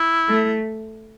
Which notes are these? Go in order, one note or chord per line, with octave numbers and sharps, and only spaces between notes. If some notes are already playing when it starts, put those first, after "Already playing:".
Already playing: E4
A3